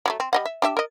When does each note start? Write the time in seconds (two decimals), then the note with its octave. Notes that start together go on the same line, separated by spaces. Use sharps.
0.06 F#3 G3 A3
0.20 C4
0.33 G3 D#5 F#5
0.45 E5
0.62 D4 G4 E5
0.77 A#4 D#5